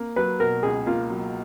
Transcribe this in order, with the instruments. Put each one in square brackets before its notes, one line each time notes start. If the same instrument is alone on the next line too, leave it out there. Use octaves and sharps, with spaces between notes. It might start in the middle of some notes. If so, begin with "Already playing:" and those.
Already playing: [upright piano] A#3
[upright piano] F#3 [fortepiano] B4
[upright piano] B2 [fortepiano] A#4
[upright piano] C#2 [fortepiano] G#4
[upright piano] A#3 [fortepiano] F4
[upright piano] F#3